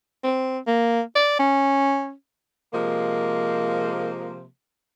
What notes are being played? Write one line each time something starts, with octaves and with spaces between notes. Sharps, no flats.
C4
A#3
D5
C#4
C3 F3 G#3 A#3